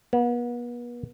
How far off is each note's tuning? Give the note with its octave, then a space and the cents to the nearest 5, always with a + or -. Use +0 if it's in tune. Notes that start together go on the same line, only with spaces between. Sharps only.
B3 -40